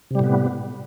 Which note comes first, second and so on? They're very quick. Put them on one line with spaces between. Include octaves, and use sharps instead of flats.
C3 G3 A2 B3